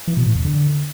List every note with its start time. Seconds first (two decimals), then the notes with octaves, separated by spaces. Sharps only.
0.07 E3
0.17 B2
0.26 A2
0.35 E2
0.45 D3